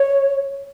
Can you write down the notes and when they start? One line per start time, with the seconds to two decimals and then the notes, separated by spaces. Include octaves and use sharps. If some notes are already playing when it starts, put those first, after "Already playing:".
Already playing: C#5